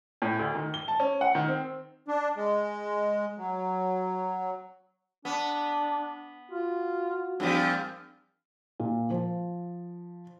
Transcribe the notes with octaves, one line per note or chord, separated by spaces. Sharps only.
A2
D2
D#3
G7
A5
C#4
F#5
D#3
C4
D4
G#3
F#3
B3 D4
F4 F#4
G2 A#2 F3 C4
A#2
F3